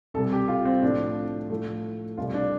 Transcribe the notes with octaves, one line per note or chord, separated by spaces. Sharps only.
C2 C3 G3 A4
G4
F4
C4
A2 F3 A3 D4
A2 F3 A3
C2 C3 G3 F4
D4